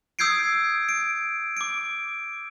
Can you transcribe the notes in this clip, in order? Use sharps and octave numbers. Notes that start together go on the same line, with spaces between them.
D#6 E6 G6 G#6 C7 D7
D7
D6 D7